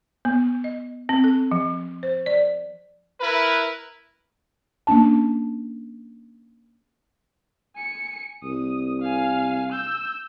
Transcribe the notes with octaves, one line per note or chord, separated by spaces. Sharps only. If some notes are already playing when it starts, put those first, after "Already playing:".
B3
D#5
C4
A4
F3
C5
D5
E4 A#4 B4
A#3 C#4 D4 A5
G#5 C#7
C2 D#6
F5 G#5
E6 G6